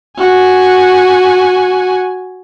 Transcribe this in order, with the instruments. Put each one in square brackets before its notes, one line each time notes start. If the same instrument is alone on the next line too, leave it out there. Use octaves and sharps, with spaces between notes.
[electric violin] F#4 G#5